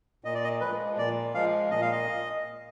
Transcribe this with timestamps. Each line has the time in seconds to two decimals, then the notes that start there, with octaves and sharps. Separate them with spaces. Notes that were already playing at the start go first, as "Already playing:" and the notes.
0.24 A#2 D#5
0.34 D5
0.44 D#5
0.61 F3 G#3 B4
0.97 A#2 D5
1.35 F3 G#3 F5
1.70 A#2 D#5
1.82 F5
1.92 D#5